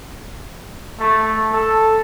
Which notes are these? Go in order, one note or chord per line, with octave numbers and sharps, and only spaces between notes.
A3
A4